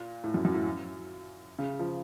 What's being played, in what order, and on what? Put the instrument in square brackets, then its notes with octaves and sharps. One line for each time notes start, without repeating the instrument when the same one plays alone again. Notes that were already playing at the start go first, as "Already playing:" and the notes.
Already playing: [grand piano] A#2
A2
F#2
F#2
A2
C#3
F3